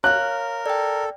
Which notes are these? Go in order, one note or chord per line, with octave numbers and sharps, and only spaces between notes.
A#4 C#5 F5 F6 F#6
A4 D5 G5